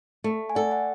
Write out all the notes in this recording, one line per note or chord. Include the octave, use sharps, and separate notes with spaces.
A3
G#5
A4 D5 F#5
F#5 A5